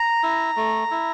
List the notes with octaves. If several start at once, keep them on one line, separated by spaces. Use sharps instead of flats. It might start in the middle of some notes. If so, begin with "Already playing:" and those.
Already playing: A#5
E4
A3
E4